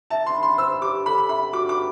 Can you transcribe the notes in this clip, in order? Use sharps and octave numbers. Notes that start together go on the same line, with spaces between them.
E5 A5
C6
B5
C6
C5 E6
G4 D6
A4 B5
B5
E5 B5
F#4 D6
D6